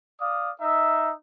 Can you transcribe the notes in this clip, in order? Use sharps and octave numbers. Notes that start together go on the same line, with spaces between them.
D5 F5 D#6
D#4 E5